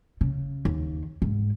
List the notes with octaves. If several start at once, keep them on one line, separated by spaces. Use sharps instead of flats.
C#3
D#2
G#2